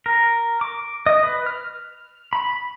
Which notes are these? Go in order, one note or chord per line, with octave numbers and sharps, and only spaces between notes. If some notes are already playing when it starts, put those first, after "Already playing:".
A#4
D6
D#5
B4
F6
B5